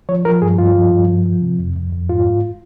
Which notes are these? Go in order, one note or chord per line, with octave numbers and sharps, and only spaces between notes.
F3 C#5
F3 A#4
G2 G#4
G2 F4
F3
G2
F3
F3
C3
F2
F2
F2
G#2 F4
G#2